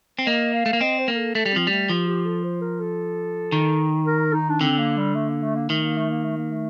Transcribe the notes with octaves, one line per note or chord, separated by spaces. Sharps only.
C4
A#3 D#5
F5
A3
A#3
C4 D#5
C5
A#3 A#4
A4
A3 A4
G3
F3 C4
G3 A3
F3 G4
G4
A4
C5
A#4
A4
D#3
A#4
D#4
D4
D3 C4
A#3
G3
A3
A#3
A3
A#3
D#3 A3
A#3
A3
A#3
A3
A#3
A3